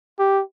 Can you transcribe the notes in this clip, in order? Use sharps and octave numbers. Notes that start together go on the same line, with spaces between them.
G4